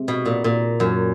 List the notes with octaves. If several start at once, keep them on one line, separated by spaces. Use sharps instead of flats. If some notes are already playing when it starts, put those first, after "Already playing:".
Already playing: C3 G#3
B2
A#2
A#2
F#2